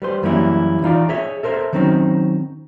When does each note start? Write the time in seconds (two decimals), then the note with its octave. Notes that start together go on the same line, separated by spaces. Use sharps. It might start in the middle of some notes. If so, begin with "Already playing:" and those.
0.02 G3 B4 C5
0.22 F#2 E3 G3 A#3 C#4 E4
0.82 E3 D#4 F4 D5
1.09 G#4 C#5 D#5 E5
1.43 A4 A#4 C5 E5
1.73 D#3 F#3 C4 C#4 D#4